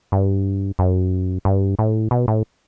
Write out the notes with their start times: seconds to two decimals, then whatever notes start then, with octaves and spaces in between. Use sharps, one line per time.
0.12 G2
0.79 F#2
1.45 G2
1.79 A2
2.11 B2
2.28 A2